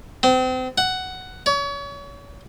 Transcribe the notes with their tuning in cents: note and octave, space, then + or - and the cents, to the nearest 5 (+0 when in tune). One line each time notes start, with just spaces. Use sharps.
C4 -35
F#5 +10
C#5 +35